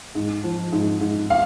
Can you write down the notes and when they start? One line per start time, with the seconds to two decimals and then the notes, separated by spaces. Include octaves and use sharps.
0.15 G#2
0.43 F3
0.72 G#2
1.01 G#2
1.30 F5